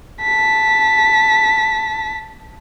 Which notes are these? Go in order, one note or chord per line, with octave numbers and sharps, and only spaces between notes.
A5 B6